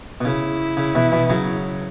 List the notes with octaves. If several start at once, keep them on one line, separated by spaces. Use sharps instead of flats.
B2
C#3 E4
C#3
B2 E3
B2 E3
C#3 F#3